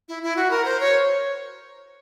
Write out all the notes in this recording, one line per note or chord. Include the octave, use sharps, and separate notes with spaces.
E4
E4
F#4
A#4
C5
C#5